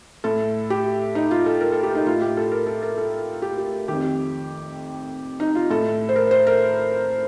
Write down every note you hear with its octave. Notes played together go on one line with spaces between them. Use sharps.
A2 A4
G4
D#4
F4
A4
A#4
A4
G4
D#4
A2 F4
G4
A4
A#4
A4
A#4
A4
G4
G4
F2 D#3 G4
D#4
F4
A2 A4
C5
A#4
C5
A#4